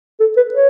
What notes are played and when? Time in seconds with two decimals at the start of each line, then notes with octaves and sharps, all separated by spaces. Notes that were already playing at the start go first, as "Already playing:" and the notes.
0.20 A4
0.37 B4
0.54 C#5